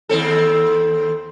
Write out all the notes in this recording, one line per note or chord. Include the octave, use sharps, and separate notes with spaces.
D#2 C4 A4